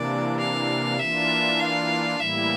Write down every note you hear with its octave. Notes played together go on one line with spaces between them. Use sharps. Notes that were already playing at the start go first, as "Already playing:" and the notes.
Already playing: C3 E3 A#3 D4 D5
F5
E3 A#3 D4 F4 E5
F5
A2 E3 G3 A#3 E4 E5